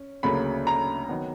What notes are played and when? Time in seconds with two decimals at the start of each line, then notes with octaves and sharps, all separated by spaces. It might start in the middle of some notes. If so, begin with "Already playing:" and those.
Already playing: C#4
0.23 D2 C#3 F#3 A#3 B5
0.67 A#5
1.09 D#3 F#3 B3